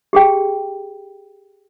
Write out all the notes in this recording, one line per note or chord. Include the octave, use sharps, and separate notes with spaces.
G4 G#4 G5